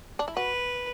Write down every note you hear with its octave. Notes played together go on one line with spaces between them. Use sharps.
D4
E4
F#4 B4